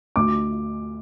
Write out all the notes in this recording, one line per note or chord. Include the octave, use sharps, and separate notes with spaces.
D2 D6